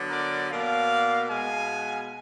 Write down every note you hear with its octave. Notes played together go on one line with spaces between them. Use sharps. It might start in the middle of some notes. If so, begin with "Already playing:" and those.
Already playing: D3 F#3 B3
A#4 D5
B2 A#3 D5 F5
B2 G#3 B3 F5 G#5